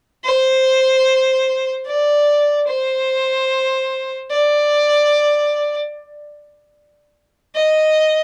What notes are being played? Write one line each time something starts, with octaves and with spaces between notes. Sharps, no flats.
C5
D5
C5
D5
D#5